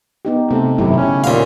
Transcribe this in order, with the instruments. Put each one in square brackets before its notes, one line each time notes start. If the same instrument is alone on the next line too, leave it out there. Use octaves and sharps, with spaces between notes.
[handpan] B3 D#4 G4
[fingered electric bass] C3 [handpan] A3 A4
[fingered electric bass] G#1 F#2 F#3 [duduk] C3 [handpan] E4 G4
[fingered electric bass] C#3 [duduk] C#4
[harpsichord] D#2 F5 [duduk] A#2